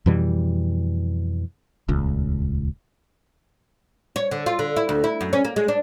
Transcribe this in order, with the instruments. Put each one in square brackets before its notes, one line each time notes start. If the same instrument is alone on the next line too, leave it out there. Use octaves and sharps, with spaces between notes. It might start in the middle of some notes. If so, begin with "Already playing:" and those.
[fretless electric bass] F2 B2 E3 G3
D#1 C#2
[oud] C#5
D3
F4
D3
E4
D2
E4
F#2
C#4
A#3
G#3
D4